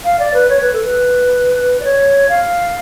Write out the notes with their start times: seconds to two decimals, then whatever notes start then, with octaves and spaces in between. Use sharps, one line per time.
0.05 F5
0.19 D5
0.34 B4
0.49 C#5
0.61 B4
0.73 A4
0.85 B4
1.80 D5
1.85 C#5
2.29 F5